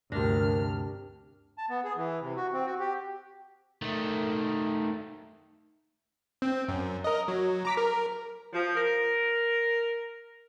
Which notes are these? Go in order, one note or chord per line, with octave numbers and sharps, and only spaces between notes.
D2 G2 C3 D4 A#4 F6 A#6
A5
B3
G#4
E3
C3
F#4
C4
F#4
G4
D#3 A3
C4
F#2
A#4 D#5
F#3
A#5 D6 B6
A#4
F3
A#4